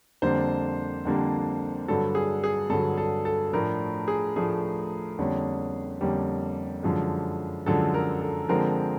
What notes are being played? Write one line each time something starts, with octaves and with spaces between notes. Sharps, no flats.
F2 D3 G3 A#3 D4 C5
F2 D3 G3 A#3 D4
G2 D3 F#3 A4
G#4
G#4
G2 D3 F#3 A4
A4
A4
A2 F3 A3 D4 A#4
G#4
A2 F3 A3 D4 G#4
F2 D3 G3 A#3 C#4
F2 D3 G3 A#3 C#4
F#2 D3 F3 G#3
F#2 D3 F3 G#3 A4
A#4
A4
D3 F3 G#3 C4 A#4